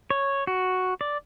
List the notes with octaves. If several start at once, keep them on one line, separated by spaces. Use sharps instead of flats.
C#5
F#4
D5